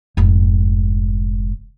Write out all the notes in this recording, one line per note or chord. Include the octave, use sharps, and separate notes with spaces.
F1 G#2